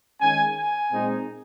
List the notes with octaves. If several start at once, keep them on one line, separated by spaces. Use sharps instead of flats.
D#3 G#3 C#4 G#5
G#5
A#2 G#3 C4 D#4